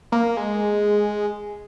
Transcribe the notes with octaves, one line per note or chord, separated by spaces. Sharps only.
A#3
G#3